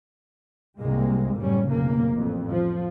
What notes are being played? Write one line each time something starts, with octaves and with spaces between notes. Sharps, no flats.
C2 G#2 G#3 A#3 C4
F#1 A2 G3 C#4
F1 B1 C#3 A#3
A1 F2
F3